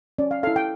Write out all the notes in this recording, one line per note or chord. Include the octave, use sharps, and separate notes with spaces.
C#4 D5
F5
E4 A4 F5
G5